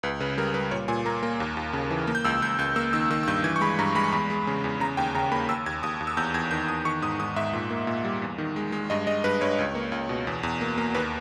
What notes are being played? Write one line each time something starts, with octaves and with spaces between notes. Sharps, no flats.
C#2 B4
C#3 B4
G3 A#4
G3 B4
A#2 C#5
A#2 G#5
A#3 A#5
A#3
D#2
D#2
C#3
E3
A#3
G6
C#2 E6
C#2 G6
C#2 G6
A#3 E6
D#3 E6
D#3 E6
E6
G2 G6
E3 G#6
C#6
G#3 B5
G2 A#5
G#3 B5
C#6
E2 B5
G#3
C#3
E2
C#3 A#5
D#2 G5
C#3 A#5
A#3 B5
D#2 E6
D#2 G#6
D#2 D#6
D#2
E6
E2 G6
E2 G#6
D#3 G6
E2 D#6
D#3 C#6
G#2 D#6
G#2 D#6
G#2 E5
A#2
A#3
A#2
G3
E2
D#3
G#3
G#3
G2 D#5
G#3 D#5
G2 B4
G2 C#5
C#2
A#3
C#2
B2
E2
E2
A#3
A#3
D#2 B4